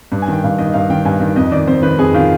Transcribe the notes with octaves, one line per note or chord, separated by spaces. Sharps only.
G2
G#5
D#3 G5
G2 F5
D#3 D#5
G2 F5
D#3 G5
G2 G#5
D#3
F2 D#5
D#3 D5
F2 C5
D#3 B4
F2 G#4
D#3 F4